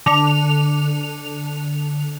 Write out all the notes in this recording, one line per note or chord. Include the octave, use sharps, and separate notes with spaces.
D3 F7